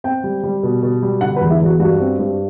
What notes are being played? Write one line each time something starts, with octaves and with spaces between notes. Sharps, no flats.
C4 G5
G3
G3
B2
B2
G3
D3 F#5
B4
E2
E4
E2 F#4
G2 F#4
C4
G2